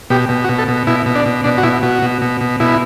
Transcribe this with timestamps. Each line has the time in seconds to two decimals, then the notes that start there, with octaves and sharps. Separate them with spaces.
0.10 B2 G4
0.29 B2
0.44 F#4
0.49 B2
0.59 A4
0.68 B2
0.87 B2 E4
1.06 B2
1.15 D4
1.26 B2
1.44 B2 D4
1.58 F#4
1.63 B2 E4
1.83 B2 F#4
2.02 B2
2.22 B2
2.41 B2
2.60 B2 E4